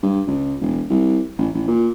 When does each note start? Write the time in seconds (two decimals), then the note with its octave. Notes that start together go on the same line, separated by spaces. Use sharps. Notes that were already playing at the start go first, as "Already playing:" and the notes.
0.02 G2
0.27 C#2
0.61 E1
0.90 C2
1.38 A1
1.54 A1
1.68 A#2